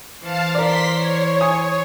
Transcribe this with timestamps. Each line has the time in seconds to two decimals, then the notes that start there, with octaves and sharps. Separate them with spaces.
0.21 E3 C5 F5 A5
0.55 A#4 D5 C6 B6
0.93 C#5
1.41 G#5 D#6